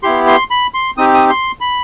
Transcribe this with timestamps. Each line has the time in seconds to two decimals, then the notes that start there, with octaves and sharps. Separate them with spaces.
0.03 B3 E4 G4 C6
0.27 C6
0.50 B5
0.74 C6
0.97 C4 D#4 G4 D#6
1.14 D#6
1.30 C6
1.61 B5